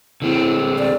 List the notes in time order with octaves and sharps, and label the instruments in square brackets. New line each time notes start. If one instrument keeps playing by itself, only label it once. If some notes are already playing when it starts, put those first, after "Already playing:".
[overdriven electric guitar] D3 C4 [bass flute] E4
[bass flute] D5